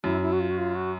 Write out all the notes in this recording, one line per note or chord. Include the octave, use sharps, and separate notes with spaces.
F#2 E4
E4
F#4
F4
F#4
F4
F#4